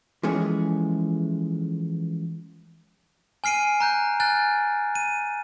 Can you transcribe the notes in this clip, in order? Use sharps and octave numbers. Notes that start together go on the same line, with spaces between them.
E3 F3 G#3 A3 C#4 G#4
G#5 F6 C7 D7 D#7
A#5 F#6 G6
G#5 F6 F#6 A6
D#7